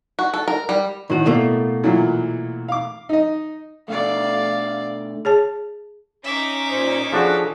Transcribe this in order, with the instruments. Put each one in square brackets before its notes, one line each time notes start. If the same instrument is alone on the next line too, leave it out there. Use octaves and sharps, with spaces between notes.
[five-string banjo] F#4
A4
A#4
G3
[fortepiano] A2 [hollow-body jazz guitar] D#3 F#4
[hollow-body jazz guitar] B2 A3 A#3
[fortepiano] A#2 E3 F#3
F5 D6
D#4 D#5
[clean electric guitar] B2 D3 A3 [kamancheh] D5 F5
[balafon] G#4 C#5 A5
[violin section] C#4 D#4 [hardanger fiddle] E5 D6
[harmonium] A#2 C5
[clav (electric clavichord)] F3 D4 F#4 [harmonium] G#4 A4